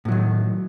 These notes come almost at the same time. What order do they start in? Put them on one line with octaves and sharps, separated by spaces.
A2 F#3 D#3